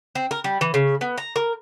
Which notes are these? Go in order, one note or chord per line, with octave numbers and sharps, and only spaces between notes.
C4
A#4
G3
E3
C#3
B3
A#5
A#4